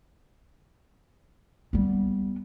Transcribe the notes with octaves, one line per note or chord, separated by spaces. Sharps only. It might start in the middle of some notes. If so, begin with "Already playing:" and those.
G3 B3